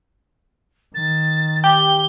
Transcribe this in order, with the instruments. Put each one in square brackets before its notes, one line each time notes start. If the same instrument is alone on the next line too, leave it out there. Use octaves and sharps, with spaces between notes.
[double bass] D#3 [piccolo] A6
[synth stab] G4 [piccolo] G7